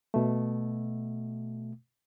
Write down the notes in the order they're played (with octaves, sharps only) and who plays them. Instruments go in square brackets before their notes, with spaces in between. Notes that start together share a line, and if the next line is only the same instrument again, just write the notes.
[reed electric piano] B2 A3